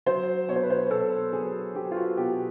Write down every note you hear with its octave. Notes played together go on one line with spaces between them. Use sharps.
F#3 C5
B2 C#5
C5
B4
C5
B2 A4
F#3 G#4
F#3 G4
F4
F#4
B2 G4